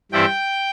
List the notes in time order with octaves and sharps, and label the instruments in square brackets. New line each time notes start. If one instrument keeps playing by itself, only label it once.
[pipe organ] G2 E3 G3 C4 E4 G5